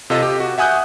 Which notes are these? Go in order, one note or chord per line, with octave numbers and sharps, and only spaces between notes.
C3 F4 A4 D#5
G4
F#4
E5 F#5 G#5 D#6 F#6 G6